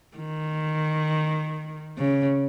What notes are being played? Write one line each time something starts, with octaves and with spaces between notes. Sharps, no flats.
D#3
C#3